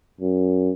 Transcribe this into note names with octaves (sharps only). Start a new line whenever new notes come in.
F#2